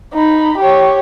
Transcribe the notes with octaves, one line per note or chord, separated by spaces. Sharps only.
D#4 B5
G4 C#5